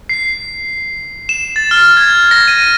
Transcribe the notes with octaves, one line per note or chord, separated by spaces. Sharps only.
C7
E7
A6
F6
G#6
A#6
D#7